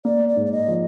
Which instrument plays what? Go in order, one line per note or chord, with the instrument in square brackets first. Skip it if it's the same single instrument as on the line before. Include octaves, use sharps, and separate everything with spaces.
[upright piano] A#3 [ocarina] D5
[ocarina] D5
[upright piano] G#2
[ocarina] D5
D#5
[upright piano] F3